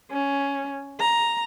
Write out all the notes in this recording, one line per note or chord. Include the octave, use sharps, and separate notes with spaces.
C#4
A#5